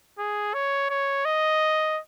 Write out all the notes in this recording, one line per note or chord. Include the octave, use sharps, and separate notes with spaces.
G#4
C#5
C#5
D#5